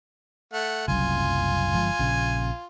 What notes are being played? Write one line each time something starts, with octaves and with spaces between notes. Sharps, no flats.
A3 F#5
F#1 C2 F#2 F4 G#5
G1 F3 G#3
A#1 C#3